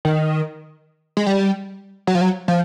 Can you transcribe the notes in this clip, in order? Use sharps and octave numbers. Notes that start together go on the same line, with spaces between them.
D#3
G#3
G3
F#3
F3
F#3
F3